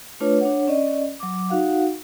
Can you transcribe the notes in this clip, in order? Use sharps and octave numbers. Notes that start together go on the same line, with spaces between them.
A3 D4 F4 B4 C#5
D4 C#5 F#5
C#4 D5 D#5
F#3 D6
D#4 F#4 F5 F#5